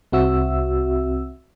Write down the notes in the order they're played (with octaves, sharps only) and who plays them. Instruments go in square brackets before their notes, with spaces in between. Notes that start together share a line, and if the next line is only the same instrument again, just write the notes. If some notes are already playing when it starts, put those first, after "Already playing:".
[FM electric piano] C2 C4 F#4 E5 E6